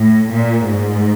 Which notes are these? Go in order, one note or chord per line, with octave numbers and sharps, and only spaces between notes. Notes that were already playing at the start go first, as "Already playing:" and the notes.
Already playing: A2
A#2
G#2